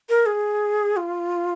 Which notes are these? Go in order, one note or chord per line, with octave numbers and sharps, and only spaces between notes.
A#4
G#4
F4